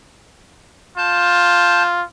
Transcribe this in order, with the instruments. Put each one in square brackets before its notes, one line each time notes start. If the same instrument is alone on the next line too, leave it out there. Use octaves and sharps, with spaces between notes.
[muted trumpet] F4 [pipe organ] A5 G6